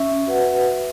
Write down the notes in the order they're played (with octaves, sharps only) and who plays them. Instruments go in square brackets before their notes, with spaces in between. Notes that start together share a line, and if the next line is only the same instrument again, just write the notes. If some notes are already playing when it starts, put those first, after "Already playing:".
Already playing: [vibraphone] C#4 [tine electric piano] E5
[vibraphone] F#4 B4 F#5